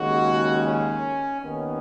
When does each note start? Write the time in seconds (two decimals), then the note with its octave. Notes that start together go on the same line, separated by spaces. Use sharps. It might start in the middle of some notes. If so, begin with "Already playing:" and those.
Already playing: D#2 C#3 G#3 F#4
0.64 C#4
1.41 D#2 D#3 B3 C#4